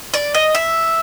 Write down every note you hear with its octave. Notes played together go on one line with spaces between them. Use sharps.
D5
D#5
E5